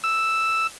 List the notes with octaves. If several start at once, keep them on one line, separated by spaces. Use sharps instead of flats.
E6